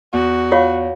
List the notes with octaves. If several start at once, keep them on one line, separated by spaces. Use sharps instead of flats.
E2 F#4
F4 C#5 F5